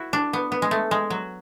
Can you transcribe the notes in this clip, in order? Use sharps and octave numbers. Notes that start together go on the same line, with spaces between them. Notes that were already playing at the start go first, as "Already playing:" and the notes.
Already playing: E4 F#4
D4
B3
B3
G#3
A3
G#3
F#3